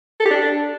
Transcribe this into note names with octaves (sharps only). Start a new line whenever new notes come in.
A4
G4
D4